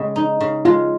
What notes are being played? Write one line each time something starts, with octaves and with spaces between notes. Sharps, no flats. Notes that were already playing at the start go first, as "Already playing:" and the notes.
Already playing: C#3 G#3
D#4
C#3
G#3 F4